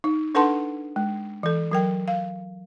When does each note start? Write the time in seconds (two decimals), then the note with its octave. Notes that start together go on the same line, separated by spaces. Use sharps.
0.04 D#4
0.35 D4 A4 B4 F#5 A5 C6
0.96 G#3
1.43 E3 A4
1.72 F#3 A#4 G5
2.08 F5